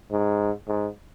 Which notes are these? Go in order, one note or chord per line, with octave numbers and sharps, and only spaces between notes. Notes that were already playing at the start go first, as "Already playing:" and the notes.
G#2
G#2